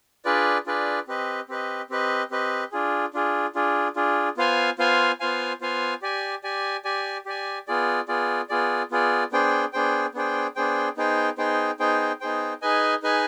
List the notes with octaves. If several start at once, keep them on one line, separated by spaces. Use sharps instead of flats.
D4 F4 G#4 B4 D5
D4 F4 G#4 B4 D5
C4 G4 B4 D#5
C4 G4 B4 D#5
C4 G4 B4 D#5
C4 G4 B4 D#5
D4 F4 G#4
D4 F4 G#4
D4 F4 G#4
D4 F4 G#4
B3 F4 C5 F5 G#5
B3 F4 C5 F5 G#5
B3 F4 C5 F5 G#5
B3 F4 C5 F5 G#5
G4 D5 G#5
G4 D5 G#5
G4 D5 G#5
G4 D5 G#5
B3 F4 G#4 D5
B3 F4 G#4 D5
B3 F4 G#4 D5
B3 F4 G#4 D5
B3 D4 G#4 C5 G5
B3 D4 G#4 C5 G5
B3 D4 G#4 C5 G5
B3 D4 G#4 C5 G5
B3 D#4 G#4 C5 G5
B3 D#4 G#4 C5 G5
B3 D#4 G#4 C5 G5
B3 D#4 G#4 C5 G5
D#4 G#4 B4 D#5 G#5
D#4 G#4 B4 D#5 G#5